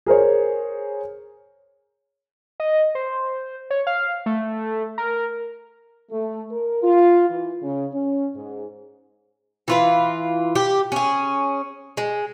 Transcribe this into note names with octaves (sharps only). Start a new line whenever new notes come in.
G#4 A#4 C5 C#5
D#5
C5
C#5
F5
A3
A#4
A3
A#4
F4
E3
C#3
C#4
G#2
E3 F4 B4
G4
C#4 G#4
G#3